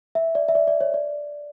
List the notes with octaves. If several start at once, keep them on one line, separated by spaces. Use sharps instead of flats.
E5
D5
E5
D5
D5
C#5
D5